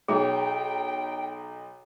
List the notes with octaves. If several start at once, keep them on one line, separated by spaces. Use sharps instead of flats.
B1 G#4 C#5 G5